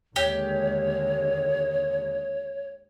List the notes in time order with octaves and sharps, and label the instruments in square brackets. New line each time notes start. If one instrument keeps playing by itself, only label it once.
[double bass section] D#2 D3 G#3 [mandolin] G4 [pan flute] C#5